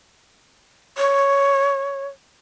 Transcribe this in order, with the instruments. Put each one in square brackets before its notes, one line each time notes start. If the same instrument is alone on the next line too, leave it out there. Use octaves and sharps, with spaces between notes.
[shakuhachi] C#5